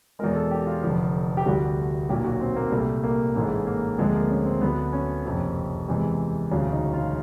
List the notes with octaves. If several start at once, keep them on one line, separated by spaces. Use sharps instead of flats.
E2 B2 G#3 A#4
A4
G4
F4
F1 F2 D3 F3
G4
D2 D3 G3 F#4
B1 A#2 F#3 G4
F#4
C4
A#3
C2 A#2 G3 A3
A#3
A1 G#2 E3 G#3 A3
A#3
D2 D3 F3 G#3 C4
A#3
C#4
C4
D2 D3 F#3 B3
C#4
F#1 F2 C3 F3
E2 C3 E3 G#3
E1 D2 C#3 F#3 D4
D#4
F4